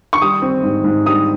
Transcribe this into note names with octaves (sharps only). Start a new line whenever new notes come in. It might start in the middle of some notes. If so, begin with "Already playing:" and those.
C#6
G3 D#6
C4
G#2
G#2
G3 D#6